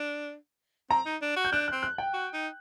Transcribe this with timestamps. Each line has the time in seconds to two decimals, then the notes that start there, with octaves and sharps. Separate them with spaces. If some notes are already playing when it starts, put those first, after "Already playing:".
Already playing: D4
0.90 C4 A#5
1.06 D#4
1.22 D4
1.37 F#4
1.45 G6
1.52 D4 F#6
1.68 F#6
1.72 C4
1.83 F#6
1.98 G5
2.13 F#4
2.33 D#4